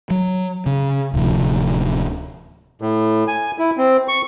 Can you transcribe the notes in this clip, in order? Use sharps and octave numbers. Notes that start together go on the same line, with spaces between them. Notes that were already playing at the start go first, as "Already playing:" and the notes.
F#3
C#3
D1 D2 C3 F3
A2
G#5
E4
C4
C#6